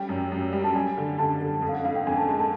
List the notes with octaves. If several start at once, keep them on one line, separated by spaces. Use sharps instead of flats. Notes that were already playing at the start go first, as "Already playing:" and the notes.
Already playing: G3 C#4 G5
F#2
F#2
G3
A5
G3 G#5
D3
D3 A5
D3
F2
F5
F#5
F2 F5
G5
F2 G#5
A5
G#3 A5
A5